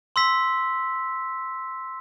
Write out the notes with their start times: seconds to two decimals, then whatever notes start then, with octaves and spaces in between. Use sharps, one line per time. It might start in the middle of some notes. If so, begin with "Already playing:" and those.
0.16 C6 E6 B6